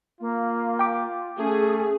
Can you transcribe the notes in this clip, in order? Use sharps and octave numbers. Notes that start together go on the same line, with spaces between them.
A#3 F4
G5 D6
A3 C#4 G#4